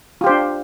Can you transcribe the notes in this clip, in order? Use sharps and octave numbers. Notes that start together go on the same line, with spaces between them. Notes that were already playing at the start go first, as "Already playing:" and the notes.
D4 F4 G4 C5